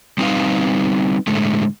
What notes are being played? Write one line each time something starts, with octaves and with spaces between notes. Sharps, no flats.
G3 C4 D#4 F#4 B4 F5
A2 D3 G#3 A3